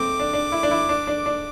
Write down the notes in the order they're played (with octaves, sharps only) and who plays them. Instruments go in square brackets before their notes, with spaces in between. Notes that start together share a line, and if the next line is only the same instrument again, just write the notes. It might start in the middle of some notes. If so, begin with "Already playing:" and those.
Already playing: [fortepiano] A3 C4 [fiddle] D6
[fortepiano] D4
D4
E4
D4
E4
D4
D4
D4